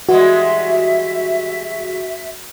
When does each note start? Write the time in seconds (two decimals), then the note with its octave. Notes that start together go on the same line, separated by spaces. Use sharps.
0.09 E3 G3 G#3 F#4 E5